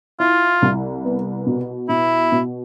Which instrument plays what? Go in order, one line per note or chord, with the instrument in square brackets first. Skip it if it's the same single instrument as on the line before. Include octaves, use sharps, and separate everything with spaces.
[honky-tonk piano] E4 [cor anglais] F4
[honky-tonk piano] C2
B3
B2
[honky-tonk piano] B2 [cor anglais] E4
[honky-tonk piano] B2